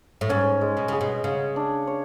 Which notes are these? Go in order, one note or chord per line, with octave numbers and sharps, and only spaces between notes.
A2
G#2 C#4
G#3
B2
C#3 G#4
B2
C#3 C#5
D4
C#5